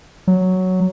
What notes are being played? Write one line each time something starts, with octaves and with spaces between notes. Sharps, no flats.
F#3